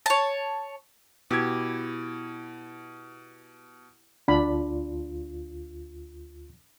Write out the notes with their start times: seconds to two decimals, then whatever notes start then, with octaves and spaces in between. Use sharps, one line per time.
0.06 C#5 A5
1.31 B2 E4 G4 G#6
4.28 D2 D4 F4 B5